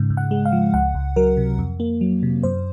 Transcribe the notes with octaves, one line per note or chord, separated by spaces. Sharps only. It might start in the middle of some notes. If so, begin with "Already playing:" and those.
Already playing: G#2 C#3
G#2
F#5
G#3
F5
F3
C#2 F#5
C#2
F#3 A#4
C3
F2
A#3
F#3
C3
F#2 C5